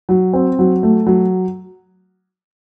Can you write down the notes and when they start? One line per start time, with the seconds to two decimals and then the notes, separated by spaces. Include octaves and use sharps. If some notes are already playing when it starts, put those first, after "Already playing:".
0.09 F#3
0.33 C4
0.59 F#3
0.83 A3
1.06 F#3